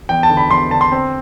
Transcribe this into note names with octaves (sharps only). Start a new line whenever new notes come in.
E2 G5
A5
D3
B5
E2 C6
D3 A5
C6
C4